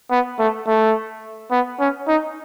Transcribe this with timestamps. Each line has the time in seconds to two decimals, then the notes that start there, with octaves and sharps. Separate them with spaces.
0.11 B3
0.39 A3
0.67 A3
1.51 B3
1.80 C#4
2.08 D#4